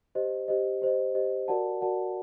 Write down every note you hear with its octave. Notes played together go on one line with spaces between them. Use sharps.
G4 C5 D#5
G4 C5 D#5
G4 C5 D#5
G4 C5 D#5
F#4 A#4 D5 F#5 A5
F#4 A#4 D5 F#5 A5